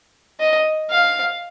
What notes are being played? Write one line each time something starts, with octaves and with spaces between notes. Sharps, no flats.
D#5
F5